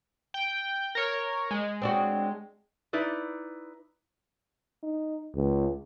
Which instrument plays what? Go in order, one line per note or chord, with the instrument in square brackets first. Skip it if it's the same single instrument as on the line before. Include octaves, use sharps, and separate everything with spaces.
[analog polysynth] G5
A#4 C#5
G#3
[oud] C4 D4 F#4
[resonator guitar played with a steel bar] D#4 E4 B4 D5
[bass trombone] D#4
C#2